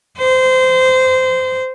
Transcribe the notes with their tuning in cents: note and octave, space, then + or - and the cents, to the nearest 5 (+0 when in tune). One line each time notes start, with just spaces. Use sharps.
C5 -20